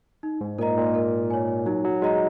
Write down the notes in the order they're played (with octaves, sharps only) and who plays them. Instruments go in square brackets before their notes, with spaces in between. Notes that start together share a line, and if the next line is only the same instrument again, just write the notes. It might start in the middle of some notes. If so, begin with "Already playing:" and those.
[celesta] D#4
[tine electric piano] G#2
[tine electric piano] A#2 [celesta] A#4 D#5 A#5
[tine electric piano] A#2
[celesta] A#4
C#5 G#5
[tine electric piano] F#3 [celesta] D#4
[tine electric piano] F#3
[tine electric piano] G#3 [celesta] F#4 D#5 A#5